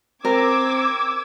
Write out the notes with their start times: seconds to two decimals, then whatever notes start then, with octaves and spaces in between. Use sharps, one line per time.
0.25 C4 A#4 D6 E6 G#6